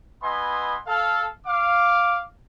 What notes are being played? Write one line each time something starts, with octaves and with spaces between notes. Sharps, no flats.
B3 E4 B4 D#5 G#5 C6
A4 F5
F5 D6